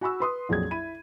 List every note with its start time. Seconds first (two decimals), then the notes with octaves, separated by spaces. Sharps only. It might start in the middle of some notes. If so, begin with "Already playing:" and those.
0.01 F#4 G#5 B5 C#6 E6
0.20 B4 C6 D#6
0.49 A#1 F2 F#3 G#4 G#6
0.71 E4 B5 D#7